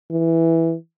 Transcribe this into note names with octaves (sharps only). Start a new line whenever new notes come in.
E3